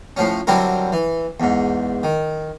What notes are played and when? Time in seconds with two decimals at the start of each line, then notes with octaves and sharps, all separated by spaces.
0.17 A2 F3 C#4
0.47 D3 F#3 G3 C4 E4 A#4
0.92 E3
1.40 E2 G#2
2.03 D#3